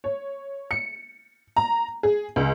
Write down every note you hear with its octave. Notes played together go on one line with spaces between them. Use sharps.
C#5
C#7
A#5
G#4
C#2